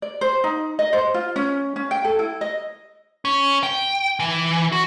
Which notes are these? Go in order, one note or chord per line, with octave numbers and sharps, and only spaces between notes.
D5
C5
D#4
D#5
C5
F4
C#4
C#4
G5
A4
E4
D#5
C#4
G5
E3
F#4